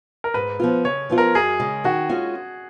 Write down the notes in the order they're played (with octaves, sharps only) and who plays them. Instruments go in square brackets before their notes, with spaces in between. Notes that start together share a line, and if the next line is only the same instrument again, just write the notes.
[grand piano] A#4
[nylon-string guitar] G#2 [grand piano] B4
[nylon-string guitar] F3 B3 F4
[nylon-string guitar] C#3 [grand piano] C#5
[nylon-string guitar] F3 B3 F4
[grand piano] A#4
[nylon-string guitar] F#2 [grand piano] G#4
[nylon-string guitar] C#3 G#3
[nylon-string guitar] D#3 [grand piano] F#4
[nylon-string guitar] G#3 C#4 F4